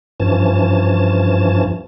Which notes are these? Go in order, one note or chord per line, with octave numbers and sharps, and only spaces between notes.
G2 E3 F3 C#4 A5